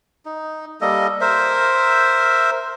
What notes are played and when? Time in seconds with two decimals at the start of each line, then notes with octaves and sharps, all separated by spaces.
0.26 D#4
0.81 G3 A#3 A4 D#5
1.21 A#4 C5 E5